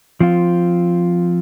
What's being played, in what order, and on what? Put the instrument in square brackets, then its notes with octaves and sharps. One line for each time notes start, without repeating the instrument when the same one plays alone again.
[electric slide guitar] F3 C4 F4